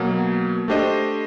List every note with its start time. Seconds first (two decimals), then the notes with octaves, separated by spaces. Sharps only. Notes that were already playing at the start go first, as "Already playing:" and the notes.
Already playing: B2 F#3 A#3
0.68 A3 D4 G4 C5 D#5